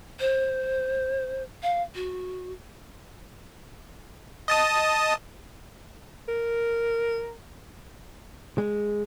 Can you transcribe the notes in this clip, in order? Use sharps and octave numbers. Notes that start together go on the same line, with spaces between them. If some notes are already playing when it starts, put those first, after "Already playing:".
C5
F5
F#4
D#5 A5 D#6
A#4
G#3